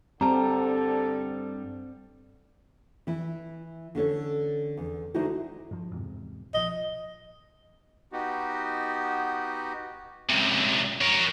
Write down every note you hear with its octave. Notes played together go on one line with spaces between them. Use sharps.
G2 D3 G3 C4 A4 A5 A#5
E3 E4
D3 C#4 A4 C#5
E2
D3 G#3 D#4 E4 F#4 C5
G2 F3
E2 G#2 C3
A#1 F3 D#5
B3 D#4 F#4 G4
C#2 C3
A#4 C#5